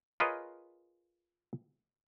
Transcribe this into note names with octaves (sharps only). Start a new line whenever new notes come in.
F4 G#4 A#4 B4 C#5 D#5